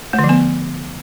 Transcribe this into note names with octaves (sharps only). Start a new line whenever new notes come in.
A3
D3
F3
B3